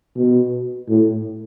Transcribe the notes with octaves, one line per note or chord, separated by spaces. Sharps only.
B2
A2